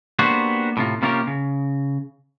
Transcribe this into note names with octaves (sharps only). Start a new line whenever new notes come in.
A#3 B3 D4 F#4 G4 C5
A2 C3 F4
C3 A#3 C#4 F4 G4 A#4
C#3